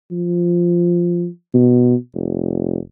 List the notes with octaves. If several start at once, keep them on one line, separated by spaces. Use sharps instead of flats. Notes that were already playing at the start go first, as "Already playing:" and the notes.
F3
B2
F1